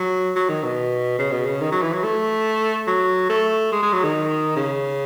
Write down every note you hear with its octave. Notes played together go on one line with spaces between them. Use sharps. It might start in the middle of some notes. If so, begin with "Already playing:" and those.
Already playing: F#3
F#3
D#3
B2
C#3
B2
C#3
D#3
F#3
E3
F#3
A3
F#3
A3
G#3
G#3
F#3
D#3
C#3